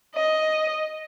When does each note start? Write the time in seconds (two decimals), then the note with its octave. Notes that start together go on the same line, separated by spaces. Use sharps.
0.15 D#5